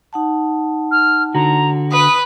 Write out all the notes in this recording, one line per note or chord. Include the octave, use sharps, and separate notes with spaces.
D#4 F#5 A5
F6
D3 F#4 A#5
B4 D#6